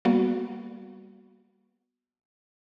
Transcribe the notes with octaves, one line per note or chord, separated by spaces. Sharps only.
G3 A#3 B3 F#4